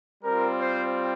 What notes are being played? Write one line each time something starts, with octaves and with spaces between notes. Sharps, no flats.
G3 C4 F4 A#4
C5